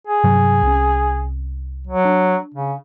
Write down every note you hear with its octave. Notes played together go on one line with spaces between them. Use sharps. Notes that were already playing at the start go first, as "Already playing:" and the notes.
G#4
G2 C3 F#3
C2 C#4
F#3
D4
C#3